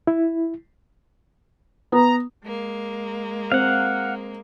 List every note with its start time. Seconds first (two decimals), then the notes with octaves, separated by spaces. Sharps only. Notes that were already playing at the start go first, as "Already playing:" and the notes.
0.07 E4
1.92 B3 A#5
2.45 G#3 A#3
3.52 C4 F5 F#5